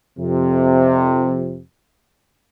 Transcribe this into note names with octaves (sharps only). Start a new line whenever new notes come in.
F2 C3